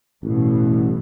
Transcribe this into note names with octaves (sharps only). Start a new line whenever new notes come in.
A1 G2 B2 E3